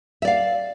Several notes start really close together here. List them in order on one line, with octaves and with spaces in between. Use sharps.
E5 D5 F5